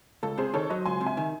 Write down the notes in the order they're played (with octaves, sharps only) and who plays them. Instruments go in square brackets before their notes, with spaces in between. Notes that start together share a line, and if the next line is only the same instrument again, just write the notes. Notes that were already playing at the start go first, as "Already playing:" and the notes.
[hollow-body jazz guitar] C#2 [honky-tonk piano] A4
[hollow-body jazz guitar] C3 [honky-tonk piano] G#4 C5
[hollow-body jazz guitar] D#3 [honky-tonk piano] A4 C#5
[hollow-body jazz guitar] F#3 [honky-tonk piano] C5 D#5
[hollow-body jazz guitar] C#2 [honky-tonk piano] G#5 C6
[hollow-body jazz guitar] C3
[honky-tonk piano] E5 G#5
[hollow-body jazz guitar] D#3